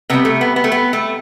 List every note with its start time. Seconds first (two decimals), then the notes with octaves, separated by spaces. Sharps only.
0.10 C3 G3 B3
0.25 A3
0.41 B3
0.56 B3
0.64 A3
0.72 B3
0.93 A3